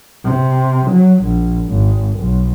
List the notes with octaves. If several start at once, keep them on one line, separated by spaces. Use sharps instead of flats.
C3
F#3
A#1
G#1
B1